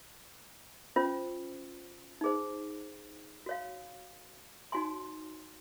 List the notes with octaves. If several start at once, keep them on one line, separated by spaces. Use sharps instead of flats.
C#4 F4 C5
D#4 G#4 C5
F#4 C#5 F5
D#4 F#4 C#5 G#5 C6